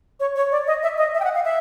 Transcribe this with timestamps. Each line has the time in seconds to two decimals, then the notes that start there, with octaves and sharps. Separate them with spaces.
0.20 C#5
0.36 C#5
0.52 D5
0.67 D#5
0.83 E5
0.98 D#5
1.14 E5
1.20 G5
1.24 F#5
1.35 F5
1.45 E5